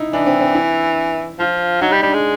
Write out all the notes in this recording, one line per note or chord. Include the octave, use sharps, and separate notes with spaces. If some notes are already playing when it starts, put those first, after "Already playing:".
Already playing: D#4 E4
E3 D4
C4
C4
E4
F3 F4
F#3 D#4
G3
G3 D4
G#3